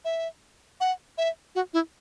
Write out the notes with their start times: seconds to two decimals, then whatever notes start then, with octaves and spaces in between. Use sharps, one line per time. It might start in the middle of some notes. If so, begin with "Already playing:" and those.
0.05 E5
0.80 F#5
1.18 E5
1.55 F#4
1.74 E4